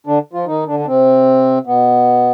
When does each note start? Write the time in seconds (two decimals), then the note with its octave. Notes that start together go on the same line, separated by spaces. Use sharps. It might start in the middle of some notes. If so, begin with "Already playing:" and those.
0.07 D3 D4
0.33 F3 F4
0.46 D#3 D#4
0.67 D3 D4
0.79 D4
0.87 C3 C4
1.66 B2 B3